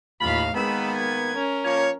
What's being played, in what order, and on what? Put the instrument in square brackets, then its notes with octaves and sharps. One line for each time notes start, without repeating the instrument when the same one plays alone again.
[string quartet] D#2 A2 F5 [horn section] F4 B5
[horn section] D#3 A#3 B3 [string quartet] G#3 B5 E6
[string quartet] G#6
C#4 A#4
[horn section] F3 A#3 C#5